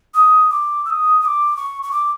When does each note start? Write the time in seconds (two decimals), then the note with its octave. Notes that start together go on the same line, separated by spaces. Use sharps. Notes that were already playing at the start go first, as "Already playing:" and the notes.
0.14 D#6
0.50 D6
0.85 E6
0.90 D#6
1.21 D#6
1.25 D6
1.57 C#6
1.83 C#6
1.92 D6